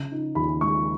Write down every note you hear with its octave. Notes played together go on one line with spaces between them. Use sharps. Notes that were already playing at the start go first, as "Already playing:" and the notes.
Already playing: C#3
D#4
D#2 B5
G#3 C#6